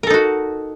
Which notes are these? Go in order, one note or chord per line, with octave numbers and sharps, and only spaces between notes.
D#4 F#4 A4 A#4